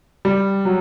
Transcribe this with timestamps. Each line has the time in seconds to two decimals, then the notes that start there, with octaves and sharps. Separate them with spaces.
0.25 G3
0.65 F#3